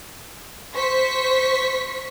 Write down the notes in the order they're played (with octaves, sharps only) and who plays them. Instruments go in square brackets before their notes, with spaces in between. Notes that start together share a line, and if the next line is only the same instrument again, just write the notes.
[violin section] C5 C#6 B6